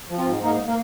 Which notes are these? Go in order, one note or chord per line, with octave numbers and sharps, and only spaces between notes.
F3
C4 F4
G#2
G#2 A#3 D#4
A#3